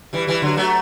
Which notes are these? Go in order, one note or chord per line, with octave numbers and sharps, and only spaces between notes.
E3 G3
E3 G3
D3 F#3
F#3 A3